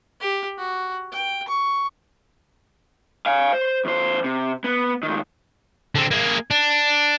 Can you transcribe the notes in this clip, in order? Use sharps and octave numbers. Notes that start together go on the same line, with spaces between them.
G4
F#4
G5
C#6
F5 G#5
C5
E2 C5
C3
B3
C#2 D#3
D3 C4
A#3 G#4
D4